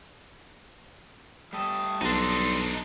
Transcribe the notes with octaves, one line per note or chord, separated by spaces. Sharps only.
G3 A3 A4 G5 D#6
B1 D4 D#4 C6